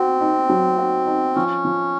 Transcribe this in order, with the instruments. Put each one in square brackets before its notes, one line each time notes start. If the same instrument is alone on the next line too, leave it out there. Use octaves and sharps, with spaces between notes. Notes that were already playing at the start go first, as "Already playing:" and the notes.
Already playing: [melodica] C4 [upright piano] F#4
[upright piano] D#4
F#3
F#4
D#4
[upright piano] F3 [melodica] C#4
[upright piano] F3